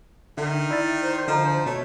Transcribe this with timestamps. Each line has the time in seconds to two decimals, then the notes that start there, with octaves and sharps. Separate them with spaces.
0.38 D3 D#3 E5
0.70 E4 D5 A6
1.03 C5
1.28 D3 F3 D#5 A#5
1.66 B2 A3 C#5